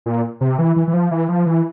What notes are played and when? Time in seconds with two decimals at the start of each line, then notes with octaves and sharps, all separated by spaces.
0.06 A#2
0.41 C3
0.59 E3
0.76 E3
0.88 E3
0.93 F3
1.11 E3
1.29 F3
1.46 E3